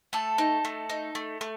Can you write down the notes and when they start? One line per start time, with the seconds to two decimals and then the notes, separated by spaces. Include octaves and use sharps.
0.13 A3 A4
0.38 D#4
0.65 A3
0.90 D#4
1.15 A3
1.41 A3